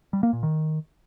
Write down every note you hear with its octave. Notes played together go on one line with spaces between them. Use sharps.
G3
A#3
A#2
D#3